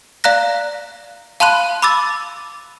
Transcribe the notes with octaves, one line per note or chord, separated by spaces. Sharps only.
D5 F5 A#5 F#6 A#6
F5 A5 B5 C6 F#6 D#7
B5 D6 E6 A6